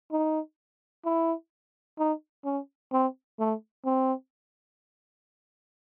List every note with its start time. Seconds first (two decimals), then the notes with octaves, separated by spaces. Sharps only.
0.12 D#4
1.05 E4
1.99 D#4
2.45 C#4
2.93 C4
3.39 A3
3.85 C4